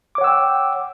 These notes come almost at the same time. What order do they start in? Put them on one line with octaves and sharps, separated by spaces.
D6 C#5 F#5 E6 G5